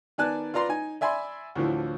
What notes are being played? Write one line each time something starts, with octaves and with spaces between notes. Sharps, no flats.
D#3 B3 D5 G#5 A5 F#6
F4 B4 D5 A#5 C6
D#4 G#5
D5 E5 G#5 B5 C6
D2 A2 D3 E3 F3